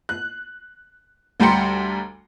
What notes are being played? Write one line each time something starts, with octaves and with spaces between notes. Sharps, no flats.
F#6
D2 G3 G4 A#5 C6 C#7